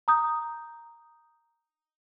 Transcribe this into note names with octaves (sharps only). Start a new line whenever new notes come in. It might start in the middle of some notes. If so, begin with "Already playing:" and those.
A#5 D#6 G6